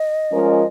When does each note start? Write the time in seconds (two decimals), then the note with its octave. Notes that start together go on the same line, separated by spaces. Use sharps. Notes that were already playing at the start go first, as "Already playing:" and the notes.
Already playing: D#5
0.32 F3 G#3 C#4 F4 A#4